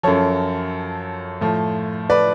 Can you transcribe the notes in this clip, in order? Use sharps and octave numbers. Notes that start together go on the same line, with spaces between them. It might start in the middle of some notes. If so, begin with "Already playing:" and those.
F#2 F3 A4 C#5
A2 F3
B4 D5